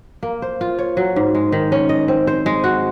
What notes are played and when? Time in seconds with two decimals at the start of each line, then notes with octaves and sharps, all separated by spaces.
0.23 A#3
0.42 C5
0.61 F4
0.79 C#5
0.97 F#3
1.16 G#2
1.35 G#3
1.52 D#3
1.72 C#4
1.89 D#5
2.08 C4
2.27 C5
2.46 G#3
2.64 F#4